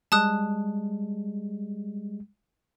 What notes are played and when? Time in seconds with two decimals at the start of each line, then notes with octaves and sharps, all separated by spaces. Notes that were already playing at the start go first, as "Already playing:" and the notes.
0.12 G3 G#3 A5 D#6 F#6